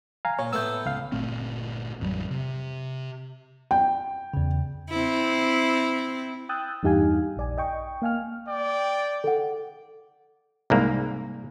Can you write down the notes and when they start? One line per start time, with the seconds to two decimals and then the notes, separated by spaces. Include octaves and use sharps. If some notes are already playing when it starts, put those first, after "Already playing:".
0.25 F5 G#5 A#5
0.39 A#2 C#5
0.53 A2 A3 B3 E6 G6
0.86 C#2 F5
1.12 G1 A#2 A3 C4
2.00 A1 F2 F#3 G3
2.30 C3
3.71 G5
4.34 E2 C#3
4.90 C4 E4
6.49 G5 D#6 E6 F#6 G6 A6
6.83 E2 G2 D#4 G4 F5 G#5
7.37 A#1 D5 G#5
7.58 D#5 G5 C#6
8.02 A#3 F5 G#5 F6
8.49 D5 G5
9.24 A4 F#5
10.70 C2 G#2 A#3